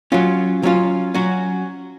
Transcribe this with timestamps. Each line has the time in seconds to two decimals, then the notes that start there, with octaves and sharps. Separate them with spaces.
0.12 F#3 C#4 F4
0.63 F#3 C#4 F4
1.14 F#3 C#4 F#4